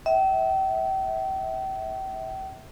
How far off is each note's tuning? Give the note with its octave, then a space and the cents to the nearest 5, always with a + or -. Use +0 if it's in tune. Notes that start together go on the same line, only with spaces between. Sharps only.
E5 -30 G5 -40